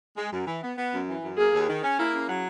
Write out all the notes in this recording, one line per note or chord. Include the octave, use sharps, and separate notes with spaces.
G#3
F#2
E3
B3
B3
F#2
E3
F#2
A#3 G#4
D#2
D#3
C#4
A#3 E4
C#3
F#3